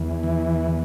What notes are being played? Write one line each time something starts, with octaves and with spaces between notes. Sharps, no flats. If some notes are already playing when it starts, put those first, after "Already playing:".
Already playing: E2
E3